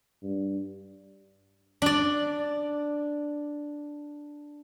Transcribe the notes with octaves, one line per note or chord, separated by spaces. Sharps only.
G2
D4 D5